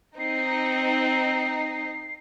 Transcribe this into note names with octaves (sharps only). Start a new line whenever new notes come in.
C4 D#4 C7